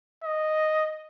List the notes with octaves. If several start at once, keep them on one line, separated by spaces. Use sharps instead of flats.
D#5